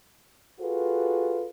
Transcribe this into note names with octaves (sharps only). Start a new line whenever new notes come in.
F4 F#4 G#4 A4 B4